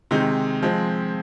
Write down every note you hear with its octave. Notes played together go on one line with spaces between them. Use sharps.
C3 D#3 G#3 D#4
F3 G#3 C4